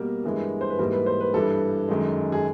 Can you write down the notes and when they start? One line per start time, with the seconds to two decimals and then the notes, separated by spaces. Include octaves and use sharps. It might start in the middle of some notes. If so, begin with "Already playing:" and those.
Already playing: B2 G3 A#3 A#4
0.24 G2 E3 G#3
0.61 C5
0.70 B4
0.79 G#2 E3 G3 A#3 A#4
0.92 B4
1.06 C5
1.21 B4
1.33 G2 E3 G3 A4
1.89 F#2 D#3 G#3
2.32 G#4